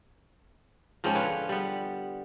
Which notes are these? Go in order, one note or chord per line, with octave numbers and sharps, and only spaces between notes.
G#2 F3 C4 C#4
D3 F4 B4 C#5
G3 B3